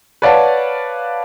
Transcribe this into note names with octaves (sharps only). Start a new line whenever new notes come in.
B4 C#5 D5 F5 F#5 A5